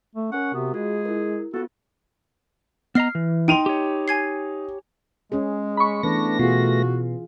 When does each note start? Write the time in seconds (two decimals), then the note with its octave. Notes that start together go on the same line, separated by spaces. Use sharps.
0.16 A3
0.32 C#4 A#4 F#5 C#6
0.54 C3 B3 F#4
0.74 G#3 F4 G#4
1.05 E4 A#4
1.54 B3 F4 F#4 A4
2.95 B3 D#5 A#5 F6 C7
3.15 E3
3.48 D#4 G5 C6 D#7 F7
3.66 G4 C#5
4.08 G#5 G#6 C7
5.32 G#3 C#4 G#4
5.77 B5 C#6
6.03 E3 A3 B3 D4 A#6
6.39 B2 F4 F#4 G#4